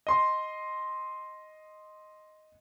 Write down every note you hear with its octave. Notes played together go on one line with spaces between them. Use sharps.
D#5 C6